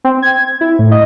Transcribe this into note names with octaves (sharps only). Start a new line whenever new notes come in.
C4
G#6
E4
A2
D#5